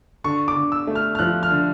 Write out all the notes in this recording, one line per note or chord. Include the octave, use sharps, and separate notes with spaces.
D3 C#6
D6
D3
E6
A3
F6
F6
F3 F#6
F6
D3